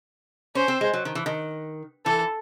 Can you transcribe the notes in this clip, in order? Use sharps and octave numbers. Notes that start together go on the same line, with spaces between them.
C#4 C5
C4
G#3
F#3
D#3
E3
D#3
E3 A4